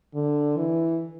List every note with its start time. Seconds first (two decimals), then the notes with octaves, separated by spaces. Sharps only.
0.14 D3
0.57 E3